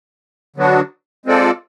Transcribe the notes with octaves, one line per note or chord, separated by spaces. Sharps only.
D3 F#3 B3 D4 F#4
G#3 C4 F4 A4 D5